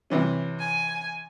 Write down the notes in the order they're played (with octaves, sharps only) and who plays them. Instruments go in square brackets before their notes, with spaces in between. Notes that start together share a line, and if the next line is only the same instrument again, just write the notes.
[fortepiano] C3 E3 C#4
[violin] G#5